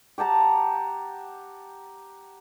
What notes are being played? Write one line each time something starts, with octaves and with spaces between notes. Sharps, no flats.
G4 F#5 A5 A#5